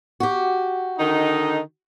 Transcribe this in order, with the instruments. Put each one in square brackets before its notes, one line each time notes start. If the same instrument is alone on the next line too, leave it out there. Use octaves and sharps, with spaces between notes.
[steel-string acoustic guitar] F#4 G4
[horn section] D3 D#3 D#4